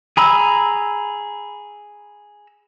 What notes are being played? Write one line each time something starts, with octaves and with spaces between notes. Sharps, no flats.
G#4 A#5 B5 E6